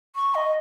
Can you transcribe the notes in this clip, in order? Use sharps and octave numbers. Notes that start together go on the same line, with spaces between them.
C#6
D#5